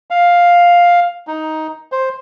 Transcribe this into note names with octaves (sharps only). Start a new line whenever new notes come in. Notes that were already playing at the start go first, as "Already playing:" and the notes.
F5
D#4
C5